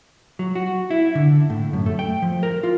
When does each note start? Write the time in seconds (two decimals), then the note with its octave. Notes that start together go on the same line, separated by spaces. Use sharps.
0.39 F#3
0.55 F#4
0.90 E4
1.15 D3
1.50 A2
1.73 F#2
1.86 A3
1.99 G5
2.22 F3
2.43 A#4
2.63 F4